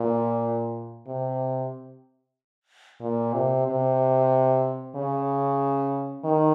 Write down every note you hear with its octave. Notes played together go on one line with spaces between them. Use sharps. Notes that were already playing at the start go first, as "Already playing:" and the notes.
Already playing: A#2
C3
A#2
C3
C3
C#3
D#3